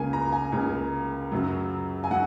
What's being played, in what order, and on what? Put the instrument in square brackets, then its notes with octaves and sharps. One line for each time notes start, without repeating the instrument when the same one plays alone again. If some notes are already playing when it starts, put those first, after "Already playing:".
Already playing: [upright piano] C#2 C#3 A#3 G#5
A#5
G#5
C#2 C#3 A#3
F#2 C#3 F#3
G#5
F#3 F#5